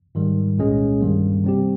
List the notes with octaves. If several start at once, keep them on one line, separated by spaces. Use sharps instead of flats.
G#2 D#3 G3
C2 A#2 G#3 C#4 G#4
G2 D#3 G3 A#3
C3 G3 C4 G4